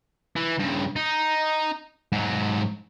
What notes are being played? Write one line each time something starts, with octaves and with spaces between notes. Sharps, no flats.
E3
G2 C#3
D#4
G#2 F#3